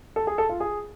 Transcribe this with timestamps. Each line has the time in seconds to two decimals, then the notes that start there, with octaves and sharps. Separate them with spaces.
0.16 A4
0.27 G#4
0.38 A4
0.49 F4
0.60 G#4